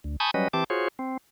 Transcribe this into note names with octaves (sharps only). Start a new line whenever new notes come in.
D2
G#5 A5 B5 C#6 D#6 G6
F#3 G3 C#4 B4 D#5
E3 C4 G4 A5 D6
F4 F#4 G#4 C5 C#5
C4